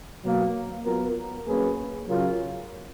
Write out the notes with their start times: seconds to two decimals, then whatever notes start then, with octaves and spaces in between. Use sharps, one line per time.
0.23 B2 F#3 A#3
0.85 F#3 B3 F4 A#4
1.47 F#3 A#3 C#4 G#4 B4
2.08 C#3 F#3 C#4 F4 A#4